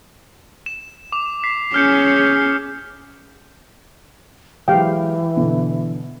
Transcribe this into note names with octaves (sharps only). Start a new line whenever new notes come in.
E7
D6 F7
B6 C7
C#4 G#4 F6 G6 C#7
E3 F#3 G#3 G4 F5 G5
B2 D3